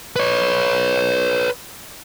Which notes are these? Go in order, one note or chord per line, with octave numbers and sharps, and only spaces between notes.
B4 C#5